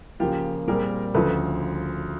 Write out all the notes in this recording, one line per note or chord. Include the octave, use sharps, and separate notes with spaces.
C#3 F3 A#3 F4 G4
A#2 G3 C4 G#4 A#4
D2 C#3 F3 A4 B4